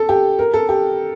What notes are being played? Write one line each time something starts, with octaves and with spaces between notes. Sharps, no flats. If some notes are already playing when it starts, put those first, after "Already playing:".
Already playing: A4
G4
A#4
A4
G4